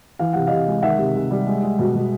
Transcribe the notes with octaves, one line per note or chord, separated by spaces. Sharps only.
E3 F5
C3 F#5
C3 D#5 F5
G#3
D#3 E5 F#5
C3
C3
G3
G#3
G#3
B2
B2